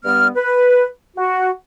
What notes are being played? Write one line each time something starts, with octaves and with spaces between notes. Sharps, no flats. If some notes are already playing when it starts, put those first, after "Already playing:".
G2 G3 B3 F6
B4
F#4